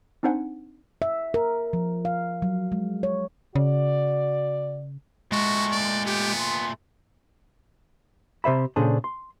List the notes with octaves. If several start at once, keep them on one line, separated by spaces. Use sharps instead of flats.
C4 D4 D#4 C5 F#5 G#5
E5
A#4
F3
F5
F#3
G#3
C#5
C#3 F#4 D5
A#2 G#3 A3 F#4 C#6
D5
B3 G4
C6
C3 C5 E5 B5
A#2 C#3 D4 G#4 A4 C5
C6